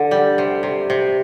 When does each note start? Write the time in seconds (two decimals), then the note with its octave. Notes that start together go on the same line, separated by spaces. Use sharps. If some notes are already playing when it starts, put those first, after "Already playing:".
Already playing: D3
0.11 G3
0.38 C3
0.63 C3
0.90 C3